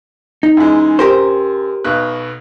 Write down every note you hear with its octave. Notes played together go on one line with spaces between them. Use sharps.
D#4
F#2 E3 G#3
F#2 G4 A#4 C5
B1 B2 F#6